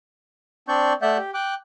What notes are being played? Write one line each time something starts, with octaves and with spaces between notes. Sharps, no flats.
C4 D4 D5 C#6 G6
A3 D5 E5 F#5 F#6 G6
G4
G5 D6 F#6